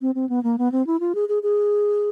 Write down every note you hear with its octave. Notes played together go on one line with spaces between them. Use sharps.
C4
C4
B3
A#3
B3
C4
E4
F4
G#4
G#4
G#4